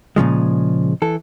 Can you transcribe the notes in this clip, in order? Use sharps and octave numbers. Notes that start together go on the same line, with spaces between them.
A#2 C#3 F3 G#3
E3 A4